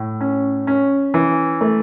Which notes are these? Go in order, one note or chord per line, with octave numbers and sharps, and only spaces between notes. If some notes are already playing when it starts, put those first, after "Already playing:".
Already playing: A2
C#4
C#4
E3
A3